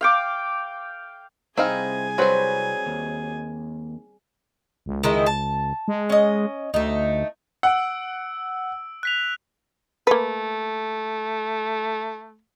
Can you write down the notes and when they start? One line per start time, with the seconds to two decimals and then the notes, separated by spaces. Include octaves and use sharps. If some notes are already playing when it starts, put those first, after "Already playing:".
0.01 F5 G5 D6
1.58 C2 C4 D#4 G#4 F5 G#5 B5
2.18 F#3 G3 C4 B4 C5
2.86 D#2
4.86 C#2
5.03 D#3 G#3 E4
5.26 A5
5.88 G#3
6.10 C#4 D#5
6.74 D2 A3 D#4
7.63 F#5 E6 D7
9.03 F#6 B6 F7
10.07 A3 A#3 B4